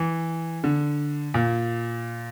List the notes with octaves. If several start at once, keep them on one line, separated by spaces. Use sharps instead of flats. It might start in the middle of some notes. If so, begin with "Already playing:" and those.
Already playing: E3
D3
A#2